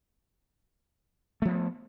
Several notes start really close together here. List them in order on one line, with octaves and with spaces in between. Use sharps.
A3 F3 B3